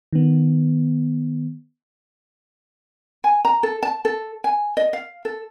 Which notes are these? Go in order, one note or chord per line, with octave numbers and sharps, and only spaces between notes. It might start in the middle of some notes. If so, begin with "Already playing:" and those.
D#3 B3
G#5
A#5
A4
A5
A4
G#5
D#5
F5
A4